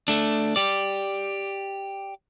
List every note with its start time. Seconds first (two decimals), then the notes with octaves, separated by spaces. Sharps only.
0.08 A3 D4
0.56 G4 D5